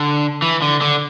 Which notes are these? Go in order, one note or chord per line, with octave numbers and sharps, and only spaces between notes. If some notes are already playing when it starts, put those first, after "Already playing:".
Already playing: D3
E3
D3
D3